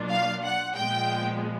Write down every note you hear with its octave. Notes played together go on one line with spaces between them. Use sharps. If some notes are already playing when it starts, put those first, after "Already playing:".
Already playing: B2 F#3 A#3 D4 F4
F5
F#5
A#2 F3 G#3 B3 G5